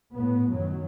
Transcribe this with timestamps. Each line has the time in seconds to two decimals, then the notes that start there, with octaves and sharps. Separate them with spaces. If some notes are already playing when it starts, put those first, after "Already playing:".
0.13 A2 B3
0.51 F#2 D#3 F#3